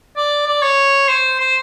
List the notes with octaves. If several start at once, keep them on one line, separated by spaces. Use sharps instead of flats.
D5
D5
C#5
C5
C5